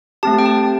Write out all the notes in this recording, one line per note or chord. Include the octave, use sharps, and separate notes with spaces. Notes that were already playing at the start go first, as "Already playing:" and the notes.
A3 C4 G4 A5
G5
A5